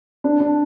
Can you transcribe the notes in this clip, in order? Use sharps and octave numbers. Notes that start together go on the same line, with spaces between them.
D4
D4